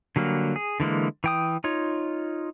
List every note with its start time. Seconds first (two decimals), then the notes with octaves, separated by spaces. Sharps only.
0.16 D3 F#3 G3 A#3
0.56 G#4
0.80 D3 E3 G#3 A#3
1.24 E3 G5 D#6
1.64 D#4 F4 C#5